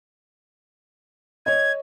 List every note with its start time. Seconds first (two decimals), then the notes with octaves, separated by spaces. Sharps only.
1.46 C#5 D#5 G#6